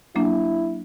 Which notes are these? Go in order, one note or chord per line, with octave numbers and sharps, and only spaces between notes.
F#3 A#3 D4 E4